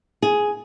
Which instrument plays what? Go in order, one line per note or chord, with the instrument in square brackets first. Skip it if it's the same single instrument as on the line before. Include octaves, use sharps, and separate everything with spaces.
[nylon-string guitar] G#4